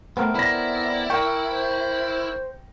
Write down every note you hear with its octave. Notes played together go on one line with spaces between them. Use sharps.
A3 B3 C4 A#4
E4 D5 B5 A#6
A#4 G5 C#6
C5